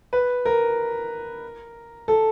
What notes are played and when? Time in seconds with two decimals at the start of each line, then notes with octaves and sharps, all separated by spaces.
0.13 B4
0.45 A#4
2.08 A4